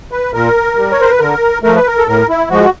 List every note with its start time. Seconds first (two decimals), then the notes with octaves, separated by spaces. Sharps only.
0.12 B4
0.34 A#2 A#4
0.77 G3
0.91 C#5
1.00 C5
1.11 B4
1.20 D3 A#4
1.63 F3 A3 A#4
1.76 B4
1.87 A#4
1.98 A4
2.08 A2 A#4
2.29 E4
2.50 F3 G#3 F#4